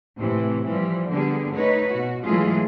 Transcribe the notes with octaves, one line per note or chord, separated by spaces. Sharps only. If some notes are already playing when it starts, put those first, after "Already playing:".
A2 C3 E3
E3 F3 G3
D3 G3 B3 G#4
A3 D#4 B4 C#5
B2 F#4
E3 F#3 G#3 A3 F4 G#4